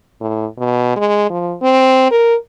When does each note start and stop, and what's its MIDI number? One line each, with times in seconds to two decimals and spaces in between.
0.21 0.46 45
0.58 0.95 47
0.96 1.30 56
1.30 1.54 53
1.62 2.10 60
2.11 2.35 70